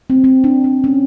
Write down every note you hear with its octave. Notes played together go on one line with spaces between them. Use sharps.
C4
C4
D4
D4
C#4